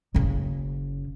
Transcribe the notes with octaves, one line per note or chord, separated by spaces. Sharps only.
F#1 C#3